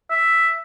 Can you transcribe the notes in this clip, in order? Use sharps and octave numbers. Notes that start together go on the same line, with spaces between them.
E5